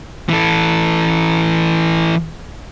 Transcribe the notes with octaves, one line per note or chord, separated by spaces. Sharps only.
E3 A4